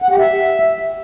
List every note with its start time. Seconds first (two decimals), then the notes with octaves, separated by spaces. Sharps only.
0.02 F#5
0.11 G4
0.19 E5